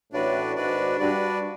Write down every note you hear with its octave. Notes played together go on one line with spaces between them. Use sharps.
A1 A2 D4 F#4 B4 D5
G#1 G#2 D4 F#4 B4 D5
G2 D4 F#4 B4 D5